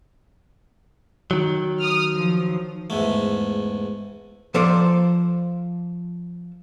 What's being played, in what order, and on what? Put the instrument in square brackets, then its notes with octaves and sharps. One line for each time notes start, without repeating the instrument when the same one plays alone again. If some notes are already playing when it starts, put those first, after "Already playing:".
[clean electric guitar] D#3 F#3
[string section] D#6 F6
F3
[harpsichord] E2 G#2 A3
[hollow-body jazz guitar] F3 A4 C5 D5